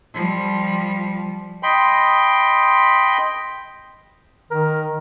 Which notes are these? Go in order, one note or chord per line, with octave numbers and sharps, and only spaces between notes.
F3 G3
D#5 G5 B5 C6
D#3 A#4